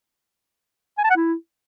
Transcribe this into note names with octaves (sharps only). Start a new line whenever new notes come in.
G#5
A5
F#5
E4